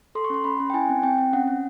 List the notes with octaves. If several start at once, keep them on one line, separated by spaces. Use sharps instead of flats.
A4 C6
C#6
C#4 C6
C#4 B5
C#4
G5
E4 G#5
C4
C4 G5
C4
C#4 F#5
C#4